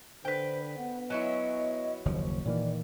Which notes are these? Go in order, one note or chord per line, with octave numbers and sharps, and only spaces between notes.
D3 B4 C5 G5
B3 F#5
F#3 C#4 E4 D#5
F#1 D#2 F3
A#2 D#3 E3 A#3 D5